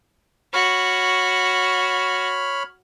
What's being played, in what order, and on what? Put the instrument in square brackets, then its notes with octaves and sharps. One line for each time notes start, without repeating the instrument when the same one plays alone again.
[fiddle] F#4 [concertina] C#5 B5 F6